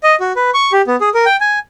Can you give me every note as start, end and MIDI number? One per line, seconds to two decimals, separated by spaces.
0.03 0.16 75
0.20 0.32 66
0.36 0.50 71
0.54 0.72 85
0.72 0.82 67
0.87 0.96 59
1.01 1.09 68
1.14 1.25 70
1.26 1.36 79
1.41 1.59 80